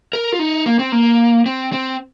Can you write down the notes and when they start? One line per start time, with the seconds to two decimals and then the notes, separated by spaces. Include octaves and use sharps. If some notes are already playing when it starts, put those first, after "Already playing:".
0.13 A#4
0.32 F4
0.39 D#4
0.66 A#3
0.79 C4
0.92 A#3
1.46 C4
1.72 C4